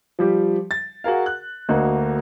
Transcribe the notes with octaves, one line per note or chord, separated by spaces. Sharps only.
F3 G3 G4
A6
F#4 G#4 A#4 F5
F#6
D2 D3 A#3 F#4 D#5